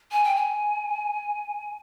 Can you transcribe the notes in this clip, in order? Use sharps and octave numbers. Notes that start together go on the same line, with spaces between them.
G#5
G5
G#5